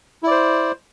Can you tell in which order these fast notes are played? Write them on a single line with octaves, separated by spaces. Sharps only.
E4 D5 C5